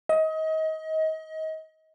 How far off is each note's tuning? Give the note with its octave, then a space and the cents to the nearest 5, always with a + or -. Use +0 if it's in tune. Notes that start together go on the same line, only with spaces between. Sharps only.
D#5 +30